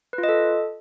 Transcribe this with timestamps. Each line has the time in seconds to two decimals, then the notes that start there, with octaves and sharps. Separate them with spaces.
0.13 B4
0.18 F4
0.23 D#5
0.29 A4